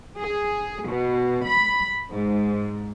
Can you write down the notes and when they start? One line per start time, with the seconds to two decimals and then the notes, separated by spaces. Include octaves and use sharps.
0.18 G#4
0.84 B2
1.44 B5
2.10 G#2